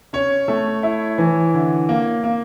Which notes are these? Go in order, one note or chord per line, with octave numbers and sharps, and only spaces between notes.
C#4 C#5
A3
E4
E3
D3
A#3
A#3